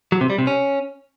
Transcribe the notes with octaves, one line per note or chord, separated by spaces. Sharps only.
F#3
C3
G3
C3
C#4